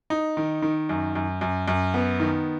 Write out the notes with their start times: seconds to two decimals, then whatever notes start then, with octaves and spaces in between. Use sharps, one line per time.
0.10 D#4
0.37 D#3
0.62 D#3
0.89 F#2
1.15 F#2
1.41 F#2
1.68 F#2
1.94 B3
2.20 D#3